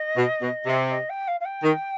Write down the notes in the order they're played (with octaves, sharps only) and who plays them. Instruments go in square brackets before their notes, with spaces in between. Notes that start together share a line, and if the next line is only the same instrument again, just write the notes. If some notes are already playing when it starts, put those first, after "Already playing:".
Already playing: [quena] D#5
[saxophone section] B2
B2
C3
[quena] D#5
G5
F5
F5
G5
[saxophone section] D#3